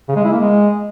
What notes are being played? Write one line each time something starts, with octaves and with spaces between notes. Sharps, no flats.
C#3
G#3
E4
A#3
G#3